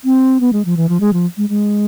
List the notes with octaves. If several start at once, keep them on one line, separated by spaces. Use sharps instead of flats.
C4
B3
G#3
F3
E3
F3
G#3
F3
G#3
G#3